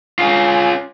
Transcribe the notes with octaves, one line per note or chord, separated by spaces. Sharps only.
C#4 F4